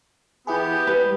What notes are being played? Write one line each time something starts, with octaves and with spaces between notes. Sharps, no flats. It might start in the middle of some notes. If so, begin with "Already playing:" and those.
E3 B3 E4 G4 G#4
G3 B4